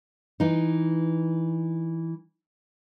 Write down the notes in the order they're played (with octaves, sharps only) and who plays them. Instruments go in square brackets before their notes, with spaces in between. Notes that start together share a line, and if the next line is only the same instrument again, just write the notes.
[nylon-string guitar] E3 D#4